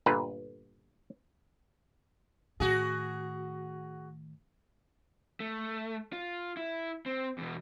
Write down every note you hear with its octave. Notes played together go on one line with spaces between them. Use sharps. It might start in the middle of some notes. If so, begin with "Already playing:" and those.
G1 A#2 D3 B4
A2 D#3 F#4 G#4
A3
F4
E4
C4
E2 B2